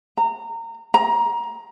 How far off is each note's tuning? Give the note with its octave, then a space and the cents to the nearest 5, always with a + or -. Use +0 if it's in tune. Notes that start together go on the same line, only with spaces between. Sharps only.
A#5 -25
A#5 +20